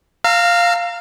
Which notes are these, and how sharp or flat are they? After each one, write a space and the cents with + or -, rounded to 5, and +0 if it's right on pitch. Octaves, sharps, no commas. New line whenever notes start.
F5 +0 A#5 -20 E6 +40